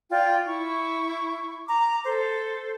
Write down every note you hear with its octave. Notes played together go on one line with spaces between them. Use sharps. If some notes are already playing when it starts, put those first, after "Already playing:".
F4 D5 G5
E4 C#6
A#5 D6
A4 C5